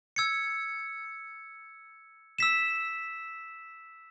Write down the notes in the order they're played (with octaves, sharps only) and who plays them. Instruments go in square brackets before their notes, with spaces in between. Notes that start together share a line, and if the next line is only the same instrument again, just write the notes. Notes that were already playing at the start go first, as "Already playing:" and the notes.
[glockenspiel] E6 G#6 C#7
E6 B6 E7